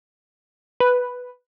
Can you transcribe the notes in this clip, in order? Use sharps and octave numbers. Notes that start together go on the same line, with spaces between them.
B4